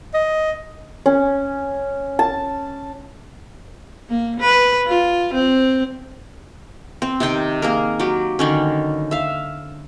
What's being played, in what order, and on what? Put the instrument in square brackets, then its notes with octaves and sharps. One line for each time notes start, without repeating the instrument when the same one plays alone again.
[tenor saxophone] D#5
[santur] C#4
A5
[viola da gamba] A#3
B4
F4
C4
[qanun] C4
C3 D#3 G5 C6
A#3 G#4 A#4
F#3 G4
D3 D#3 C#4
E5 F5